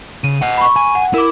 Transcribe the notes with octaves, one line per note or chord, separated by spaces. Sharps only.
C#3 D#7
D#5 F#5
B5 C#6
G#5
F#5
E4 A#4 D6